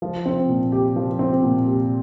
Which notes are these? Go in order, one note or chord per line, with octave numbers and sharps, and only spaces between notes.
F3
C4
A#2
G4
F3
C4
A#2
G4